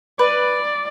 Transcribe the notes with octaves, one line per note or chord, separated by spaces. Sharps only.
B4 D5